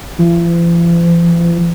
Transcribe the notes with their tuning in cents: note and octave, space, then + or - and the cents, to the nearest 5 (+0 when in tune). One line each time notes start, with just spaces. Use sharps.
F3 -45